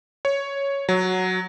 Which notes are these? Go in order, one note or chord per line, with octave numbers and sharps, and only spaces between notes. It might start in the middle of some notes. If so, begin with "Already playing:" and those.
C#5
F#3